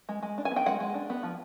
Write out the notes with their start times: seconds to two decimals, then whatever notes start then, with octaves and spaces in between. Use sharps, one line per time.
0.09 G#3
0.23 G#3
0.38 D4
0.45 G#5
0.51 B3
0.56 G5
0.66 G#3 F#5
0.80 G#3
0.94 D4
1.10 B3
1.23 F3